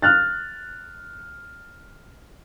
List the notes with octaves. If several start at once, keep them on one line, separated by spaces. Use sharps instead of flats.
F6 F#6 A6